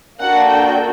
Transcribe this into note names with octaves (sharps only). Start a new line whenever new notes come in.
A#3 D4 F#4 A4 F#5
G5